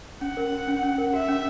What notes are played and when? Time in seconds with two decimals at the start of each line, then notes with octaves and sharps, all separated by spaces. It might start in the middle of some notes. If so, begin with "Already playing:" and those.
0.21 C#4 F#5
0.37 A#4
0.52 F#4
0.67 C#4
0.83 C#4
0.98 A#4
1.13 F#4 E5
1.28 C#4